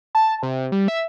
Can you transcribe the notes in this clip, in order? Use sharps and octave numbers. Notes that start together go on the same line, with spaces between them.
A5
C3
G3
E5